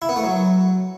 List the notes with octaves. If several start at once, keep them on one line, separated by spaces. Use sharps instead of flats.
E4
B3
A3
F#3